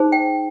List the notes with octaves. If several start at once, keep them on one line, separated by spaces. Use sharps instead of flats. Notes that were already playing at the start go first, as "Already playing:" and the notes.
Already playing: D#4 G#4 C5
G5